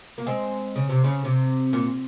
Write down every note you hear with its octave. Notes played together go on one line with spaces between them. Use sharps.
A#3
G#3 C4
C#3
C3
C#3
C3
A#2